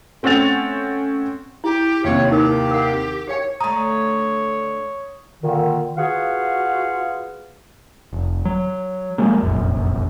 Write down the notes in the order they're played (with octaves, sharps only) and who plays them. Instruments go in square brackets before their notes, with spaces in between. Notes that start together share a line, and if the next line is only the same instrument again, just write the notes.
[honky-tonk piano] A3 C4 C#4 F#5 A6 F7
[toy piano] E4 [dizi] G4
[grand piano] D#2 C3 [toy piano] G4 [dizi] C#5
[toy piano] D#4 A#4 [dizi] G4
[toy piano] A#4 F#5
[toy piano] G4 G5 [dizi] C#5
[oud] D3 A3 [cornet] C#5 [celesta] A#5 [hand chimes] D#6
[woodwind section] A#2 D3 D#3
F4 F#4 G#4 B4 F5 F#5
[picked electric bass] F1
F#3
F3 F#3 G#3 A#3
F1 A#1 F#2